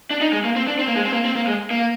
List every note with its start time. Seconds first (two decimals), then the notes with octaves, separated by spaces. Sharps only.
0.11 D4
0.21 D#4
0.33 G#3
0.44 A#3
0.56 C4
0.67 D4
0.79 C4
0.87 A#3
0.96 G#3
1.05 C4
1.13 A#3
1.25 C4
1.36 A#3
1.47 G#3
1.71 A#3